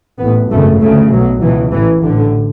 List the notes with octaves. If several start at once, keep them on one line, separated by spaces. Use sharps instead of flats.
A1 A2 B3
G#1 F#2 C#3 A3
D2 C#3 A3
B1 B2 F#3
C#2 B2 E3
A1 A2 E3
A1 A2 D3